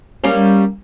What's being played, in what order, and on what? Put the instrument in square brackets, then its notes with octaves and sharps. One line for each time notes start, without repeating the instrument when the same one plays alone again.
[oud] G3 A#3 C#4